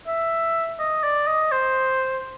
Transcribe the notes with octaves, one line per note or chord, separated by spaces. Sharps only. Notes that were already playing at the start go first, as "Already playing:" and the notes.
E5
D#5
D5
D#5
C5